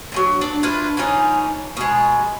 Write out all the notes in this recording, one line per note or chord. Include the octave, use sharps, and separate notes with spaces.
D3 E3 F#3
D4 D5
D4 E4 F4 B4
E3 F3 C#4 D#4
B2 G#3